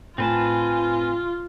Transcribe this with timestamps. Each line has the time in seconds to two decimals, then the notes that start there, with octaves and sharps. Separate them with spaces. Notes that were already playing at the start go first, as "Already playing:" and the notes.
0.18 A2 C4 F4 B4 G#5 A5